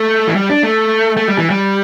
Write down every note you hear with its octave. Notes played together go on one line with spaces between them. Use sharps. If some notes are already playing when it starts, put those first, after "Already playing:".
Already playing: A3
E3
G3
D4
A3
A3
G3
E3
G3